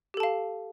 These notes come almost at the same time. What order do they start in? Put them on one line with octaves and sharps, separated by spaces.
G4 A4 A5 F5